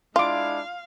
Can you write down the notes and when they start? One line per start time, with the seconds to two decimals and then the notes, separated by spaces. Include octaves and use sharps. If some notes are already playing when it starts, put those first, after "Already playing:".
0.16 G#3 D4 E4 F4 F5 C6 D6